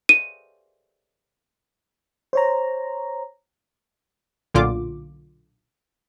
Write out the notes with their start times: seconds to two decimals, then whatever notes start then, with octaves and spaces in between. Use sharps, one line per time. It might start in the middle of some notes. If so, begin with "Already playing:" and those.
0.09 D#7
2.33 C5 C#5 A#5
4.55 B1 A#2 D3 F4 D6